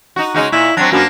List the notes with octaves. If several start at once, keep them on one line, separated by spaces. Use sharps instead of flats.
D#4 F#4
C#3 G#3 D#4 F#4
A#2 E4
F#3 C4 D4
F#2 A#3 B3 D4